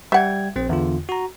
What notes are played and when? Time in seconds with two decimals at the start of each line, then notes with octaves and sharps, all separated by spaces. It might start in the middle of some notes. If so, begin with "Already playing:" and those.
0.12 G3 E5 F#5 G5 G#6
0.56 A#1 C4 C5
0.69 E2 D3 F4
1.09 F#4 A#5